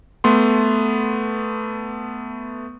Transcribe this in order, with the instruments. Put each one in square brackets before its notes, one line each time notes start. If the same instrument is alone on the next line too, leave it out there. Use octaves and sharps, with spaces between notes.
[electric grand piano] A3 B3 C6